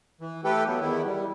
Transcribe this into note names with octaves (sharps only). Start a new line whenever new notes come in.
E3
A3 G4 A4 B4 G5
F#3 B3
E2 D#3 B3 E4
G3